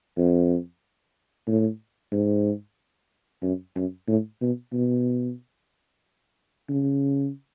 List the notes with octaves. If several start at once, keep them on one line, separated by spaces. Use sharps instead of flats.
F2
A2
G#2
F#2
F#2
A2
B2
B2
C#3